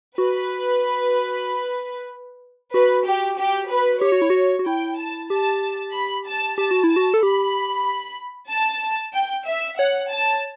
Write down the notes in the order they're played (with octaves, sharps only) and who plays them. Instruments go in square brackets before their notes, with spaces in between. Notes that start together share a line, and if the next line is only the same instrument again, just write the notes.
[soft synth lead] F#4 [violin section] B4
[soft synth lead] F#4 [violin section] B4
[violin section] G4
G4
B4
[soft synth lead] G4 [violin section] C#5
[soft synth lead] F#4
E4
F#4
F#4
[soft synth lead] E4 [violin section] G5
[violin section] A5
[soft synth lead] G4 [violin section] A5
[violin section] B5
A5
[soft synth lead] G4 [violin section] A5
[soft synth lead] F#4
E4
[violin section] A5
[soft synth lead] F#4
A4
[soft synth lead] G4 [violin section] B5
[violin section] A5
G5
E5
[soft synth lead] C#5 [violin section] F#5
[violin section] A5